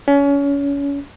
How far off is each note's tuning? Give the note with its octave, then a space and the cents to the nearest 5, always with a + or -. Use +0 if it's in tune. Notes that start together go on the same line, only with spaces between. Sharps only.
C#4 +30